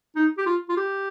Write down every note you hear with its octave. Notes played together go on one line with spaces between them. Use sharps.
D#4
G4
F4
F4
G4